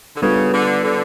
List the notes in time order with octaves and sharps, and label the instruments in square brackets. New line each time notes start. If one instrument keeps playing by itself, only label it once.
[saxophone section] D3
[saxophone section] C#3 [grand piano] G3 B3 D4 F4 A4
[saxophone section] D3
D3